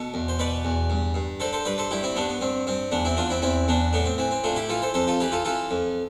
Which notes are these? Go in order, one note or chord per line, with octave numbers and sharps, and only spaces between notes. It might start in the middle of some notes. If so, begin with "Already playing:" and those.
Already playing: B2 A4
E2
C5
B2 B4 D5
E2
G2
G2
D3 A4 C5
A4 C5
G2 B4 D5
A4 C5
G2 E4 G4
C4 E4
G2 B3 D4
B3
G2 C4
G2 C4
E2 B3 D4
C4 E4
E2 D4 F4
C4 E4
E2 C4 E4
E2 B3 D4
A2 B3 D4
C4
E3 C4
C4
A2 D4 F4
E4 G4
E3 F4 A4
A4 C5
F2 A4 C5
F4 A4
E3 G4 B4
F4 A4
E3 F4 A4
F2